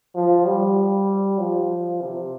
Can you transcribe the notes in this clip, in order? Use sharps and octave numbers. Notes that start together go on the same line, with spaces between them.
F3
G3
F3
C3